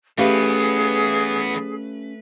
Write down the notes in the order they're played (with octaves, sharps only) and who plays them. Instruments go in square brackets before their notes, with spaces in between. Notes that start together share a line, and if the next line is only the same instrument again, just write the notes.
[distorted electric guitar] E3 B3 [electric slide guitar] A3 B4 [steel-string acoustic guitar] C#4 G4 F5 [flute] G#4